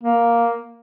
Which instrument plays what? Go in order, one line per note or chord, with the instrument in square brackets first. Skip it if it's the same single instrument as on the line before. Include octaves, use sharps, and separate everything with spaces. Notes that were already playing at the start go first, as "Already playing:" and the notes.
[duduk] A#3